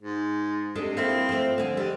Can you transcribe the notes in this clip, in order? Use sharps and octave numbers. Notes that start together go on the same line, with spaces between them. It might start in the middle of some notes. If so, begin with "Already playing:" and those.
G#2
C3 G#3 D4 A4
A#3 C4 E4 A4
F3 A3
D3 G#4
G3 G#3